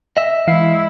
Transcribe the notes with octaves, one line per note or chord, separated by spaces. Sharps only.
D#5 E5
E3 G#3 E4 F5 C7